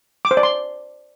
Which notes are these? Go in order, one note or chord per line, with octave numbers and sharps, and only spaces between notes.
D6
C5
D5
C6